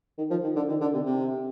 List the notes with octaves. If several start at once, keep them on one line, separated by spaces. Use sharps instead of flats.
D#3
F3
D#3
D3
D#3
D3
C3
C3